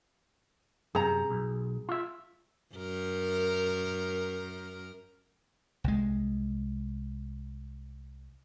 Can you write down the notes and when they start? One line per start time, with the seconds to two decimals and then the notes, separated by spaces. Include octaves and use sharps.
0.95 F#2 C3 G#4 A#5
1.30 B1
1.89 F4 E5
2.75 F#2 A#4
5.84 C2 G#3